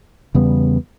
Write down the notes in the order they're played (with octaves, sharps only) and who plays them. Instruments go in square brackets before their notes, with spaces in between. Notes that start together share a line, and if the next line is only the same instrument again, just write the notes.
[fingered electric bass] E2 C#3 G3 B3